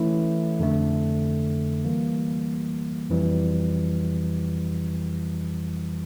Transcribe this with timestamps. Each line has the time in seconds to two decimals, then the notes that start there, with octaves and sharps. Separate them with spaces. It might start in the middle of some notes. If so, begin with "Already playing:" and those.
Already playing: E3 A3 C#4 E4
0.59 F2 D3 A3
1.85 E3 G3 A#3
3.10 F2 E3 G3